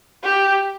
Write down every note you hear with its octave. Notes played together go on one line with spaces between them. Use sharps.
G4